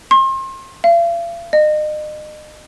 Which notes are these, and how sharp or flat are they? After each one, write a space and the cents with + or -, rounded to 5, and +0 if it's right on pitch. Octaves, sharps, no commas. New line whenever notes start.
C6 +35
F5 -45
D#5 -35